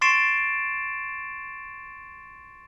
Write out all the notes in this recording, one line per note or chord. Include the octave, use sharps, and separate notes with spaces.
C6 C#6 A6 C7 D7 E7